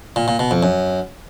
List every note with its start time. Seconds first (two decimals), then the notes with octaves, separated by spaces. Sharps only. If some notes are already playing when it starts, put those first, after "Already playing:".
0.16 A#2
0.28 A#2
0.39 B2
0.51 F2
0.63 F#2